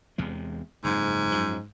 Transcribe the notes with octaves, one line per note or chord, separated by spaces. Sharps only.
E2 C3 G#3
F#1 F2 G#2
F#2 F3